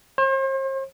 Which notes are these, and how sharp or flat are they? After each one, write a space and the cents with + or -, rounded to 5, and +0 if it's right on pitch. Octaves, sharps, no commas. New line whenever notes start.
C5 +40